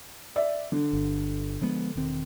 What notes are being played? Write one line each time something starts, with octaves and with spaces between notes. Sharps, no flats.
D5 E5
D3
G1
F3 G#3 B3
E1 D#3 C4